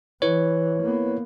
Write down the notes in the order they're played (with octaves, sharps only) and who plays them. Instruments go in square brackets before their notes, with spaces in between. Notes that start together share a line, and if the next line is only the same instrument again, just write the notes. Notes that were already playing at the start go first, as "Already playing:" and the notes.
[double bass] E3 [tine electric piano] E4 B4 C#5
[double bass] A#3 B3